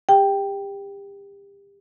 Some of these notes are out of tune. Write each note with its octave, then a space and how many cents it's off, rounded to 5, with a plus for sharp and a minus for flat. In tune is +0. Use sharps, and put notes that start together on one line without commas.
G4 +30 G5 +0